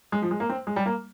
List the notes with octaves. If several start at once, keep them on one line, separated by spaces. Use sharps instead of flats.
G#3
F3
G#3
A#3
C4
G#3
G3
A#3